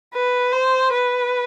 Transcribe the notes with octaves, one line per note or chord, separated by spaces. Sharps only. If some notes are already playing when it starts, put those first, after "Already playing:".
B4
C5
B4